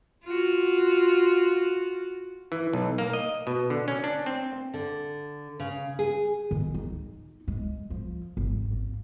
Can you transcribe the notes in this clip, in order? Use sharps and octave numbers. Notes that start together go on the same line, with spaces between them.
F4 F#4
E3
B1
A#3
D#5
B2
D3
C#4
D4
C4
D3
C#3
G#4
D#3
D#4
G#3
F3
G#1
A#3